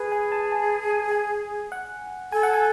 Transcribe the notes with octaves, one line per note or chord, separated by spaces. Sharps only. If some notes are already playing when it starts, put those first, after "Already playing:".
Already playing: G#4 B4
G#5
A5
A5
G#5
F#5
A4 G#5
F#5
G#5